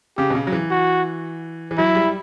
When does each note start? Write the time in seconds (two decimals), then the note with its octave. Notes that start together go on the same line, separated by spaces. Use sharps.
0.17 C#3 G4
0.30 B2
0.35 C#3
0.47 F#3
0.52 E3
0.71 F#4
1.71 E3
1.78 F#3 E4
1.95 G3
2.07 G3